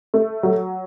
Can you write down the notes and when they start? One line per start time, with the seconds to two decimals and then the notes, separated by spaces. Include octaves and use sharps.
0.14 A3
0.43 F#3